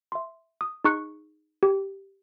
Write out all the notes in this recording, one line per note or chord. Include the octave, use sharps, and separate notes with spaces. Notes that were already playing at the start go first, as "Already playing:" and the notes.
E5 C6
D#6
D#4 G#4 C#6 F#6 C#7
G4